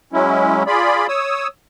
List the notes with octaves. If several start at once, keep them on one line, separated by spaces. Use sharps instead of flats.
F#3 G#3 C#4 E4
F4 G#4 D5 B5
C#5 D#6 E6